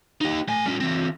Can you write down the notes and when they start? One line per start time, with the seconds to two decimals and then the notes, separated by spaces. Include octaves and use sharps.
0.21 D#4 G4
0.48 A3 G#5
0.65 G3 C#4
0.80 E3 C4